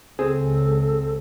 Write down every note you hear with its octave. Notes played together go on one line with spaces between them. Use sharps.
C#2 C4 G#4 A4